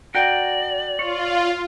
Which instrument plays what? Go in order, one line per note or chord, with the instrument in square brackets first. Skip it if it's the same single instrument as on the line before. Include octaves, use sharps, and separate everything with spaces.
[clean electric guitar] F#4 A#4 G5 [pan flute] D5
[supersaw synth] F4 [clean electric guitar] C#5